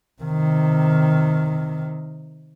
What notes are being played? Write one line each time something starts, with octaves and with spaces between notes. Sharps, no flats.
C3 D#3